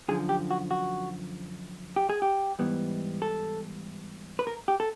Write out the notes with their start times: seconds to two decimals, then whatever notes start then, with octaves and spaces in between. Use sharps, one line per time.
0.08 F#2 D3 F3 G#4
0.29 G4
0.51 F#4
0.71 F#4
1.96 G4
2.10 G#4
2.22 G4
2.59 G#2 E3 G3 B3
3.22 A4
4.39 B4
4.47 A#4
4.68 G4
4.80 A4